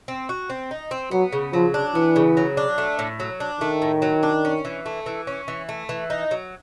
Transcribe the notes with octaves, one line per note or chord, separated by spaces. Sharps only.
C4
F#4
C4
D#4
C4
F#3 B3
C#3
F3 F#3
D4
E3 B3
C#3
F#3
D4
A3
A2
F#3
D4
D#3 A3
A2
F#3
D4
C#4
E3
A3
E3
C#4
E3
A3
E3
D#4
F#3